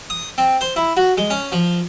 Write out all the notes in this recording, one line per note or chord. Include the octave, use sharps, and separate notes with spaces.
D#6
C4
C5
E4
F#4
G#3
C#4
F3